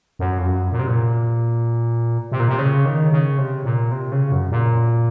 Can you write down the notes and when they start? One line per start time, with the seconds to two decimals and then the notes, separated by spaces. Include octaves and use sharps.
0.19 F#2
0.38 F2
0.46 F#2
0.72 A#2
0.79 C3
0.87 A#2
2.32 C3
2.40 A#2
2.49 C3
2.59 C#3
2.85 D#3
3.12 C#3
3.38 C3
3.65 A#2
3.92 C3
4.12 C#3
4.32 F#2
4.51 A#2